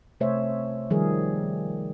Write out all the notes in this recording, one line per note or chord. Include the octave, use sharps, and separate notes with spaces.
C3 A3 C5 C#5 E5
D#3 F3 G3 G#4 A#4